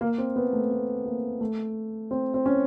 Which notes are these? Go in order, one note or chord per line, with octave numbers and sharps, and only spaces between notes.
A#3
C4
B3
A3
A3
A#3
A3
C4
C4
C#4